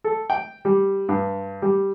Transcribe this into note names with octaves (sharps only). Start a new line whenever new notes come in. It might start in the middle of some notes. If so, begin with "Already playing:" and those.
A4
G5
G3
G2
G3